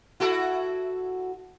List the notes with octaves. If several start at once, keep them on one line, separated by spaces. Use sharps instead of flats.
E4 F#4 A4